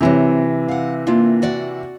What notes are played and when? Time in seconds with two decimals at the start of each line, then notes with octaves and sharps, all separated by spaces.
0.01 C3 E3 F#3 C4 A#5
0.68 F5 F#5
1.07 A#3 D4 F4
1.42 F#4 D5 F#5